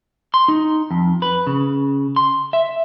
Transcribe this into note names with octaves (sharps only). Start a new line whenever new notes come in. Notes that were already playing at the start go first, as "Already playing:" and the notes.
C6
D#4
F2
B4
C#3
C6
E5